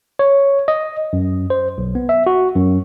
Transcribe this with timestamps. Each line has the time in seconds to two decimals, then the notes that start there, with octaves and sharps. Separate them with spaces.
0.19 C#5
0.68 D#5
1.13 F#2
1.50 C5
1.78 B1
1.95 B3
2.09 E5
2.27 F#4
2.55 F#2